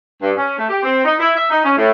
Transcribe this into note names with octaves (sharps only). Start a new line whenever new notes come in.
G2
C#4
A3
G4
C4
D#4
E4
E5
D#4
C#4
A2